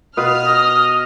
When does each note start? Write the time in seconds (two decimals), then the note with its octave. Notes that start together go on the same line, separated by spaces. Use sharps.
0.17 B2 F4 B4 D#6 F6
0.47 D#5